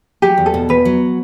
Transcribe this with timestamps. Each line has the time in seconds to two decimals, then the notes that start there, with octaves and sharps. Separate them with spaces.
0.22 F#3 G4
0.38 E2
0.46 A4
0.54 B2
0.69 E2 B4
0.85 F#3